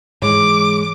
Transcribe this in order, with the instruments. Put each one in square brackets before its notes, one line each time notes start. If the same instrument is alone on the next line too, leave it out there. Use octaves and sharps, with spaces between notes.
[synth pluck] G#2 E3 [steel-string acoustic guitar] G#3 C#5 [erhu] D6